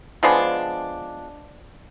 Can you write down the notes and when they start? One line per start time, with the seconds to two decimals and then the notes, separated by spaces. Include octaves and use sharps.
0.23 F3 G#3 B3 D4